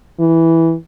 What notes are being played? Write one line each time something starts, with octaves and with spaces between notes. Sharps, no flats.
E3